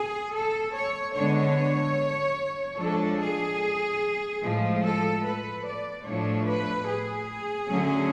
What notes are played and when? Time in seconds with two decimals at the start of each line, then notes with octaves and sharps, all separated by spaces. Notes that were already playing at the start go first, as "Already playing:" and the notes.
Already playing: G#4
0.34 A4
0.74 C#5
1.14 D3 G#3 B3 D4 C#5
2.78 F3 G#3 D4 A4
3.20 G#4
4.43 A2 F3 G#3
4.83 A4
5.24 B4
5.65 D5
6.06 A2 F3 A3 D4 C#5
6.46 B4
6.88 G#4
7.69 D3 F#3 A3 C#4